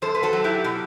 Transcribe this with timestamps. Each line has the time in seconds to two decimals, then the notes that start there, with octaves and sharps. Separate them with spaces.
0.02 F#2 A4 C5
0.15 B4
0.23 F#4 A4
0.33 F#3
0.44 E4 G4
0.64 B2